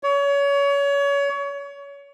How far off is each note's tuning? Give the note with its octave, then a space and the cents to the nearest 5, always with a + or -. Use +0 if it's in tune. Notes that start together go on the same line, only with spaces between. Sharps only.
C#5 +30